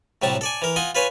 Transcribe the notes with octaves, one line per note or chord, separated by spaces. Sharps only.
A2 C3 F#3 G3 A5
A4 D5 G#5
E3 A#4
F4 D#5 F#5 G#5
F4 B4 C#5 G#5